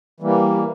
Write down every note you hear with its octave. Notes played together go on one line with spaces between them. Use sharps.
E3 G3 A#3